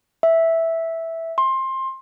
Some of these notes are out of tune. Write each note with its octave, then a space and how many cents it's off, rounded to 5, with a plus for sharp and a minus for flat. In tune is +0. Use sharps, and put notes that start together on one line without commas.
E5 -5
C6 +20